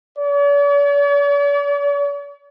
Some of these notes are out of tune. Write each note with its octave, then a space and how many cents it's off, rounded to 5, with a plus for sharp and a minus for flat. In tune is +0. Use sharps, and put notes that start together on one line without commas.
D5 -45